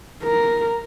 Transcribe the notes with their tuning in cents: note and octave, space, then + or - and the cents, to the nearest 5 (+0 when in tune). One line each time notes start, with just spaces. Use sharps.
A#4 +0